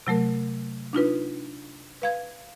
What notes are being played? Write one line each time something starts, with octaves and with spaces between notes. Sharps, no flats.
C3 F#3 A3 A#4
D4 D#4 F4 B4
B4 F5 G#6